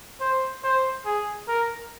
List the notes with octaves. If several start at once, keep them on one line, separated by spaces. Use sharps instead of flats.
C5
C5
G#4
A#4